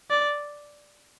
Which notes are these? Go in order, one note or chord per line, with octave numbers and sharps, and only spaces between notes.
D5